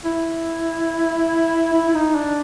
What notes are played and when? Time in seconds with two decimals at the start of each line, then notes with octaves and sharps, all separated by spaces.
0.05 E4
1.73 E4
1.88 E4
1.94 D#4
2.15 D4